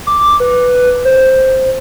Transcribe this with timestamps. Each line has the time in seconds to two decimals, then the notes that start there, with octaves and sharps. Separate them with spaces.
0.07 D6
0.40 B4
1.05 C5